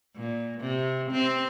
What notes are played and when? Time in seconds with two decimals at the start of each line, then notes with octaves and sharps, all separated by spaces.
0.16 A#2
0.61 C3
1.11 C4